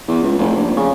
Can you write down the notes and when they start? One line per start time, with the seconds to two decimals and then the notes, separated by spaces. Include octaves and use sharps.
0.08 E2
0.23 C#2
0.38 F1
0.56 A#1
0.77 C#3